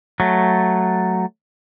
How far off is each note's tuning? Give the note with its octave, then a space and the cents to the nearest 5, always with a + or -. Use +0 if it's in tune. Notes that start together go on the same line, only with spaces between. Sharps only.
F#3 +0 A3 +0